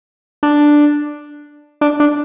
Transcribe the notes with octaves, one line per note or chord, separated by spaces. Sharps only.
D4
D4
D4